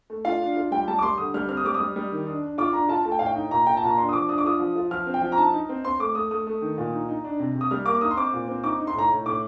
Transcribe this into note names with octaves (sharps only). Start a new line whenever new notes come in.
A3
F4 F5
D4
F4
G3 G5
G3 A5
D6
G3 C6
D3 D#6
G3 F6
C4 F6
D#6
G3 D6
D#6
G3
G3
D#3
D4
D4
F4 D6
D4 A#5
F4 A5
A3 A5
G5
A2 F5
G5
D#4
A#2 A#5
A#2 G5
A5
A#2 A#5
D4 C6
D#6
F3 D6
D4 D#6
D6
F4 D#6
F3
F4
F3 F6
C4
G5
F3
A#5
D#4 A5
D#4
C4
C4 C6
A3 D6
A3 D#6
A3 D#6
A3
D#3
A#2
D#4
D#4
D4
C3
C3
D#6
G3 F6
A#3 D6
D#4 D#6
C6
C4 D6
A#2
C4
D#4 D6
D#4
C6
A2 A#5
A2
A2 D6